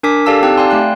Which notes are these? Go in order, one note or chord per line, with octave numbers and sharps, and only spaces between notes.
D4 A#4 G#5 D6 B6
G4 A4 D5 F5 A5 E6
C4 D#4 G4 G5 A5 F#6
D5 F5 G5 G#5 C6
A3 D5 F#6